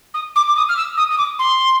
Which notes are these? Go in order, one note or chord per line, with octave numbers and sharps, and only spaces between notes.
D#6
D6
D6
D#6
F6
E6
D#6
D#6
D6
C6